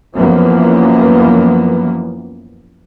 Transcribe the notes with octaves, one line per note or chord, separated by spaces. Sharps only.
F#2 E3 F3 A#3 B3